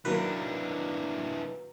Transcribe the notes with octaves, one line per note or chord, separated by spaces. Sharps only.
D#3 E3 F#3 A#3 D4 B4